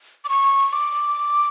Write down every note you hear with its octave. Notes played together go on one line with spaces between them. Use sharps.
D6
C#6
D6